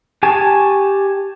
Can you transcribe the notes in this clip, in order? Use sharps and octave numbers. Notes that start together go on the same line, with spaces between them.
G4 G#5 A5 C#6